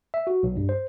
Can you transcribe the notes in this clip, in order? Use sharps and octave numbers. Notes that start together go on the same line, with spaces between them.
E5
F#4
B1
G2
C5